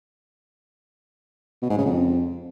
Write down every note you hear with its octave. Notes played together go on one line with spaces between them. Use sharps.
B2
G#2
C#3
F2